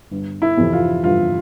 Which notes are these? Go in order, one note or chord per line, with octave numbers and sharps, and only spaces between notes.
G1
E4
F2 C3 E3
F4
G1 F4